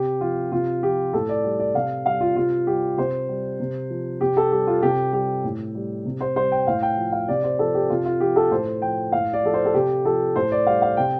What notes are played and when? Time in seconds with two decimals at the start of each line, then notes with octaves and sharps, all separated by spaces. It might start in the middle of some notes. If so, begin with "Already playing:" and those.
Already playing: C3 G4
0.21 F3 F4
0.52 C3 F4
0.83 F3 G4
1.13 A2 A4
1.29 D5
1.44 G3
1.60 D5
1.74 C3 F5
2.06 G3 F5
2.21 F4
2.36 C3 F4
2.67 G3 G4
2.98 C3 C5
3.29 G3
3.60 C3
3.90 F3
4.21 C3 G4
4.37 A4
4.52 G3 G4
4.67 F4
4.82 C3 G4
5.13 G3 G4
5.44 A2
5.75 G3
6.05 C3
6.21 C5
6.36 G3 C5
6.52 G5
6.67 A2 F5
6.82 G5
6.97 F3
7.12 F5
7.28 C3 D5
7.44 C5
7.59 F3 A4
7.75 G4
7.90 C3 F4
8.06 F4
8.21 F3 G4
8.36 A4
8.51 A2 C5
8.82 F3 G5
9.12 A2 F5
9.33 D5
9.43 F3 A4
9.54 C5
9.66 A4
9.74 C3 G4
10.05 F3 A4
10.36 A2 C5
10.52 D5
10.67 G3 F5
10.82 F5
10.97 C3 G5